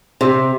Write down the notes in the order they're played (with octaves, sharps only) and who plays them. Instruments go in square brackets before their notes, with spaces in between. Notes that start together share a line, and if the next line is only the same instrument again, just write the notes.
[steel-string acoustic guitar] C3